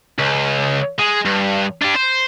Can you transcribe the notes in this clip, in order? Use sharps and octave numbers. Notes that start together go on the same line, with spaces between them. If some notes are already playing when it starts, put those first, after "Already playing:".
C#2
G#3
G2
D4 G4
C5